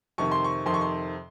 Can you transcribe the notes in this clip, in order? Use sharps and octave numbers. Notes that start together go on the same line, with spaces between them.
F2 C3 D#3 C#6
C6
C#6
F2 C3 D#3 C6
C#6
C6